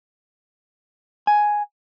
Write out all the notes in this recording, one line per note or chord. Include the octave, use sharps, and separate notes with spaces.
G#5